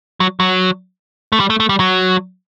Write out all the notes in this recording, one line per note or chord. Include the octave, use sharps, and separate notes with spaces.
F#3
F#3
A3
G3
A3
A3
G3
F#3